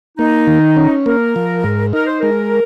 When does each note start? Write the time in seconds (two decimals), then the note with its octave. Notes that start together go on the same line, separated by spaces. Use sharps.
0.18 A#3 D#4
0.47 D#3
0.76 C#4
1.06 A#3 A#4
1.36 F3
1.64 G#2
1.93 D#4 A#4
2.07 C5
2.20 G#3 A#4